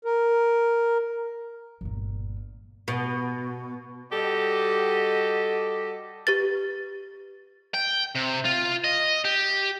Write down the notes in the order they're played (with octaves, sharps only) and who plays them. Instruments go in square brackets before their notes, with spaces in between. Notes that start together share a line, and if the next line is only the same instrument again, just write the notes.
[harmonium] A#4
[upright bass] G1 A#2
[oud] B2
[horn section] G3 F#4 G4 A4 D#5
[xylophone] G4 B4 A6
[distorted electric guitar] G5
C3
F4
D#5
G4